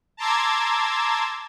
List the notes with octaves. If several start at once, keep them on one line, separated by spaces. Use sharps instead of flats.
A5 A#5 C6 D6 E6 G#6